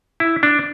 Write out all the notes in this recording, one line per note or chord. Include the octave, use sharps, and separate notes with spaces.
E4
D4